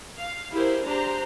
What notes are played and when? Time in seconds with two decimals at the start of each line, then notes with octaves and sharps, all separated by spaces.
0.18 F5
0.52 E4 G4 G#4 A#4 C5
0.85 D4 G4 C5 A#5